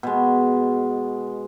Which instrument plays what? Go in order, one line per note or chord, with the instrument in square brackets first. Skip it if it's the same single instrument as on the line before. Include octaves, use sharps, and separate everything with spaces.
[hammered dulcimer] B2 G#3